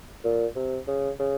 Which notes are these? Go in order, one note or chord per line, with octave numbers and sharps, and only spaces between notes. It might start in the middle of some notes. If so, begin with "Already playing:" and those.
A#2
C3
C#3
C#3